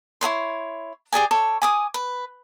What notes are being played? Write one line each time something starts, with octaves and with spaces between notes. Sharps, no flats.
E4 G#4 C#5 C6
G4 G#4 D5 G#5
A4 C#5 D6
G#5 D6 D#6
B4